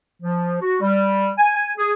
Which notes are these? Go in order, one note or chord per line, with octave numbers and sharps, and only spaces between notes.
F3
F#4
G3
G#5
G#5
G#4